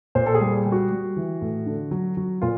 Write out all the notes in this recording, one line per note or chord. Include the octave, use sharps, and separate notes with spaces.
A#2 C5
A4
G#4
G3
G3
F#4
G3
E3
A2
D3
F#3
F#3
A#2 F4